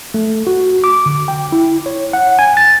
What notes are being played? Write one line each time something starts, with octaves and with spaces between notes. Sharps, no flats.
A3
F#4
D6
D3
G5
E4
C#5
F#5
G#5
A6